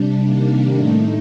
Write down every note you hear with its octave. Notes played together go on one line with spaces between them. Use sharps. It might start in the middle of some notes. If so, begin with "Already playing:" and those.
Already playing: C3 G3 D4
C3 D#3 G3 A#3 D4
A2 A3 D#4